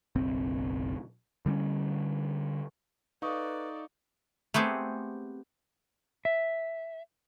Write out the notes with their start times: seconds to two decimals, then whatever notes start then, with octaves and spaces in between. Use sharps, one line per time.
0.15 F#1 B1 C4
1.46 D3 G3 C4 C#4
3.22 D#4 A4 B4 D5 F5 C#6 D#6
4.54 A3 B3 C4 G4 G#4
6.25 E5